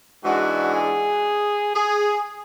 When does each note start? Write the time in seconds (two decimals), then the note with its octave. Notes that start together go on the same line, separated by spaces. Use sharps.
0.24 G#2 E3 G#3 D4 F#4
0.74 G#4
1.76 G#4